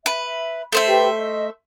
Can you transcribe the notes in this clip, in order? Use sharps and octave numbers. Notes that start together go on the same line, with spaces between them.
B4 E5
A3 C5 E5
G4 B4 G5
D#5